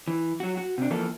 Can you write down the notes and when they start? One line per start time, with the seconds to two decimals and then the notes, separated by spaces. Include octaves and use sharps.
0.08 E3
0.40 F#3 F#4
0.57 F#4
0.78 C3 D4
0.90 E3 F3 A#3 A4